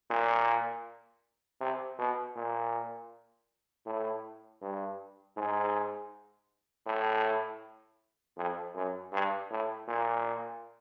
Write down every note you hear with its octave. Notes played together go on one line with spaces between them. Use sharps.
A#2
C3
B2
A#2
A2
G2
G#2
A2
F2
F#2
G2
A2
A#2